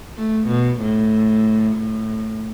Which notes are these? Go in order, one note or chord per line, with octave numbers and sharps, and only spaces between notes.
A3
B2
A2
A2